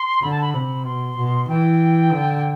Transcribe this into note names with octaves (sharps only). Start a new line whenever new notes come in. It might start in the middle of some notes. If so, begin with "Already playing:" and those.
Already playing: C6
D3 B5
A5
B5
C3 B5
B2 C6
B2
E3 G5
D3